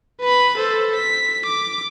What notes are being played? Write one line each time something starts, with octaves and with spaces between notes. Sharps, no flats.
B4 B5
A4 C5
B6
D6